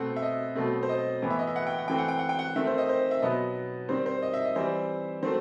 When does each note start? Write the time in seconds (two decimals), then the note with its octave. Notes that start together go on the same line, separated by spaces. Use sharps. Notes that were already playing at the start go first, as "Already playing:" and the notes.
Already playing: B2 A3 C4 F#5
0.16 E5
0.22 D#5
0.55 B2 F#3 A3 C4
0.83 C5
0.89 D#5
1.22 A2 E3 B3
1.30 E5
1.39 D#5
1.47 E5
1.56 F#5
1.67 G5
1.78 F#5
1.88 E3 A3 C4 G5
1.98 F#5
2.08 G5
2.19 F#5
2.29 G5
2.39 F#5
2.56 D#3 A3 C4 E5
2.67 C5
2.78 D#5
2.89 C5
3.11 E5
3.22 B2 F#3 B3 D#5
3.89 D#3 G3 C4 C5
4.06 C5
4.22 D#5
4.34 E5
4.45 D#5
4.56 E3 G3 C4 C5
5.23 D#3 F#3 A3 C4 C5